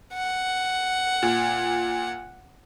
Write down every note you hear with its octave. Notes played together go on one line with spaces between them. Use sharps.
F#5
A#2